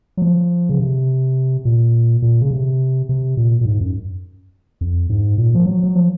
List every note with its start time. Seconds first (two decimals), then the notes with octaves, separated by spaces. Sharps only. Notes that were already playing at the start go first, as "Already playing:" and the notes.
0.17 F#3
0.22 F3
0.69 C#3
0.80 C3
1.65 A#2
2.22 A#2
2.41 C#3
2.51 C3
3.09 C3
3.37 A#2
3.61 A#2
3.65 G#2
3.81 F#2
4.81 F2
5.10 G#2
5.38 A#2
5.55 F3
5.66 F#3
5.84 F#3
5.95 F3